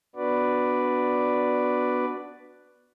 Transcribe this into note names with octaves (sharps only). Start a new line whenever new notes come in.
B3 D4 F#4 B4 D5